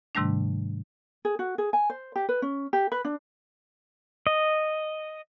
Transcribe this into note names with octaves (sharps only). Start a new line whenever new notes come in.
G#2 C3 D#3 G3 A3 D4
G#4
F#4
G#4
G#5
C5
G4
B4
C#4
G4
B4
D4
D#5